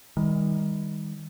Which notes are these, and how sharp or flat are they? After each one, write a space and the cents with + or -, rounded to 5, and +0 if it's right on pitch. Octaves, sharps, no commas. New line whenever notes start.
D#3 +30 G3 +45